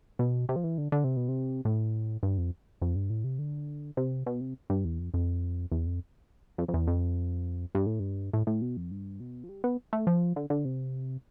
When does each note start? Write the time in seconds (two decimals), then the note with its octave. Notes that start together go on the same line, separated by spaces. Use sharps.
0.19 B2
0.49 C3
0.56 F3
0.64 E3
0.78 D3
0.92 D3
1.04 C3
1.17 B2
1.29 C3
1.65 A2
2.23 G2
2.38 F2
2.82 F2
2.95 G2
3.10 A2
3.24 C3
3.39 D3
3.97 C3
4.26 B2
4.41 C3
4.70 G2
4.85 E2
4.99 F2
5.14 F2
5.72 E2
5.87 F2
6.58 F2
6.68 F2
6.74 E2
6.87 F2
7.75 G2
7.86 A2
8.00 G2
8.33 A2
8.47 A2
8.62 B2
8.77 F2
8.91 G2
9.20 B2
9.44 F3
9.49 G3
9.64 B3
9.93 A3
10.07 F3
10.36 D3
10.50 D3
10.65 C3